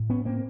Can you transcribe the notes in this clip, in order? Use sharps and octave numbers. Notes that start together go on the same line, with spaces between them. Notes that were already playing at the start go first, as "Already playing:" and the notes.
Already playing: A2
B3 C#4
A#3 C4